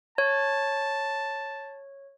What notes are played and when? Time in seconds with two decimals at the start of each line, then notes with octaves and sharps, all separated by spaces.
0.18 C#5 A5